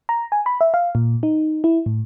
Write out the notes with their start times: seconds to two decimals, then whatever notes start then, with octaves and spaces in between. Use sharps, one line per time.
0.09 A#5
0.32 G#5
0.46 B5
0.61 E5
0.74 F5
0.95 A#2
1.23 D#4
1.64 E4
1.86 A2